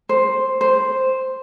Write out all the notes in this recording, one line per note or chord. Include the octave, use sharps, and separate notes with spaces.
C5
C5